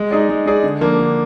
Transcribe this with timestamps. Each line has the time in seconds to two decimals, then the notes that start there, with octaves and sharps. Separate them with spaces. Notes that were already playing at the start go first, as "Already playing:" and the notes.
Already playing: G#3
0.11 D#4 G#4 D5
0.29 G#3
0.46 D#4 G#4 D5
0.63 D3
0.81 F3 A#3 D4
0.98 D3